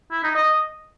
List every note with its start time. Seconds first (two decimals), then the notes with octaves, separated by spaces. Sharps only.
0.12 E4
0.23 D#4
0.35 D#5